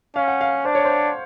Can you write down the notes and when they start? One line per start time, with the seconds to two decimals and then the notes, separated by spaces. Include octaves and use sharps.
0.16 C#4 F5
0.28 F#5
0.41 F5
0.65 D4 C5
0.75 C#5
0.85 C5